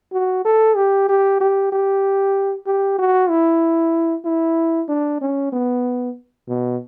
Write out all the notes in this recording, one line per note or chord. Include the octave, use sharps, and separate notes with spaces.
F#4
A4
G4
G4
G4
G4
G4
F#4
E4
E4
D4
C#4
B3
B2